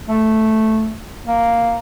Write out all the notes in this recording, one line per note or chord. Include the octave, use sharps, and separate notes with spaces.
A3
A#3